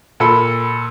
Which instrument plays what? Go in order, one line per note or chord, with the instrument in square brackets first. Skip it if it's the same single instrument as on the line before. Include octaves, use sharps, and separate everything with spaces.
[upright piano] A#2 A4 B5